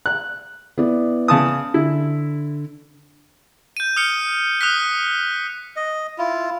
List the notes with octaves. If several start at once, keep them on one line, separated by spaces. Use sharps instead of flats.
F#6
B3 E4 D5
C#3 A5 D#6
D3 E4
G6 D#7
D#6 F6 C#7
D#6 F6 F#6 B6
D#5
E4 F4